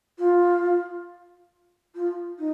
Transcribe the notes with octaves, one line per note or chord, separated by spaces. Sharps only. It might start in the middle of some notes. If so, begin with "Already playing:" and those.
F4
F4
D#4